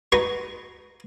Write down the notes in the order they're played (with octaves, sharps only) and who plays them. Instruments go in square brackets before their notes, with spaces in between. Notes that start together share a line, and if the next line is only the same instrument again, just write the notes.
[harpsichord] D#4 F#4 B4 C6